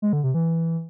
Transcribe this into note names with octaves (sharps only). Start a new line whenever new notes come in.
G#3
D3
C3
E3